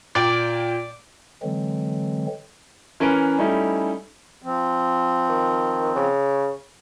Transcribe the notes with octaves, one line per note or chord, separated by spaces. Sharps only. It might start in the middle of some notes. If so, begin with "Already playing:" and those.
A#2 D5 G5
D3 E3 F#3 G#3 C4
E3 C#4 A#4 B4 D7
G3 A3 C#4 D#4 E4
F3 C4
D#3
C#3